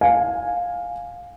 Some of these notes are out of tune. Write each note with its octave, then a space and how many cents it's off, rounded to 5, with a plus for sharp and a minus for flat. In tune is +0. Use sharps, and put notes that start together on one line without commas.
F5 +15 G#5 -5